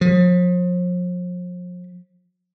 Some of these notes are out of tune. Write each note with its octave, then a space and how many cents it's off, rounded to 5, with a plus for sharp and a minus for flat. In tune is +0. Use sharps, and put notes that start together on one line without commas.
F3 +40